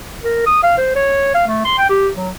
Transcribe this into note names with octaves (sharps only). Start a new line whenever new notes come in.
A#4
D#6
F5
C5
C#5
F5
A3
C6
G5
G4
F#3